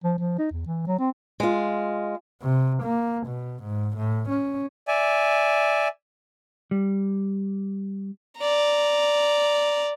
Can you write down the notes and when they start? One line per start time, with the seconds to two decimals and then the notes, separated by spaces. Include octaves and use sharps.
0.04 F3
0.18 F3
0.39 D#4
0.51 E2
0.66 E3
0.87 F#3
0.99 C4
1.40 G#3 F4
2.42 C3
2.83 A#3
3.27 B2
3.63 G#2
3.97 A2
4.30 C#4
4.88 D5 E5 G#5
6.71 G3
8.38 D5 A#5